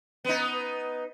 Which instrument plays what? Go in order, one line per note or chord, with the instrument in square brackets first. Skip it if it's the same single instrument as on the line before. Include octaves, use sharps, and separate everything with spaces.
[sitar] B3 D#4